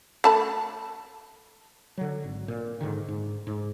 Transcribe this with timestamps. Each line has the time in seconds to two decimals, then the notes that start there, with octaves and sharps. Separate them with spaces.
0.24 A3 A5 B5
1.97 D3 F#3
2.24 G#1
2.48 A#2
2.81 G#2 D3 D#3
3.08 G#2
3.47 G#2